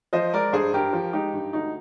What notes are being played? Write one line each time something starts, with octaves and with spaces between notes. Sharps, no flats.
F3 C5 D#5
G#3 A#4 D5
G2 G#4 C5
G2 G4 A#4
F3
G#3 D#4 G4
G2
D2 D#4